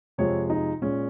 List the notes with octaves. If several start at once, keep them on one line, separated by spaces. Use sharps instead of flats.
F2 C3 F3 G#3 C#5
D#4
A#2 G#3 C#4